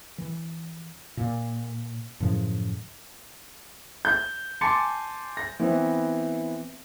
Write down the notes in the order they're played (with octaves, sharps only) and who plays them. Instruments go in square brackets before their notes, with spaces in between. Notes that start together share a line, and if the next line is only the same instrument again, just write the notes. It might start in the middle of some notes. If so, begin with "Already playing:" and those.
[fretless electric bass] E3
A#2
F#2 A2 C#3 F3
[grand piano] G6
G#5 A5 C6 D6 A6 C#7
A#6
E3 B3 C4